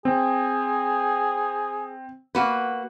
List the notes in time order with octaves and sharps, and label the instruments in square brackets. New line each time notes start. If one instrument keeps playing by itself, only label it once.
[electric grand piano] C4 [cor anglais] G#4
[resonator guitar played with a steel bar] A#3 F#4 B4